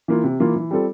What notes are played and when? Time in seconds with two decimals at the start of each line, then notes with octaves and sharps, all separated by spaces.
0.08 E3 A#3 F4
0.24 C3
0.40 E3 A#3 F4
0.56 E3
0.71 G3 C4 F4 A4